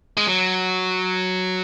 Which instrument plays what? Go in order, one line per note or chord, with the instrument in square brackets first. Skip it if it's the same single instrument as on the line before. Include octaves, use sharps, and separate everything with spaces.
[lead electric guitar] G#3
F#3